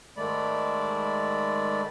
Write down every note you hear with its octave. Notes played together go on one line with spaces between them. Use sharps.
G#2 D#3 G#3 A3 D5 B5